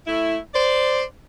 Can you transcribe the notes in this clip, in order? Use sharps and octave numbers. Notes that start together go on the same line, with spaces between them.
A3 E4
C5 D5